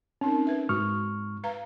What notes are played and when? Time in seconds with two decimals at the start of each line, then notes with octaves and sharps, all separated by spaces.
0.21 C4 C#4 D#4 A#4
0.47 B4 E5
0.69 G#2 F#4 C#6 F6
1.43 B4 F5 A#5